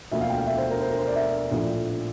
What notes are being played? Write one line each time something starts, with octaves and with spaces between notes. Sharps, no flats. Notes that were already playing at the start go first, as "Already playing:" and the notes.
E1 D2 D3 F3 A#3 E5
F5
G5
F5
E5
C5
A#4
C5
A#4
C5
D5
E5
A#1 A2 F3 A3